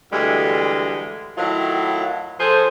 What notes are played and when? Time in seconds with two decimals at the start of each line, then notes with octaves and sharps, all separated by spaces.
0.12 D2 E3 G3 G#3
1.37 A2 D#3 F#3 E4 F4
2.40 F3 G#4 A4 C5